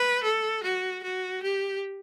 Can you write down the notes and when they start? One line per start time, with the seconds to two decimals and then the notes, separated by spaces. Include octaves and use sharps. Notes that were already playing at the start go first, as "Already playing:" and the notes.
Already playing: B4
0.23 A4
0.63 F#4
1.03 F#4
1.42 G4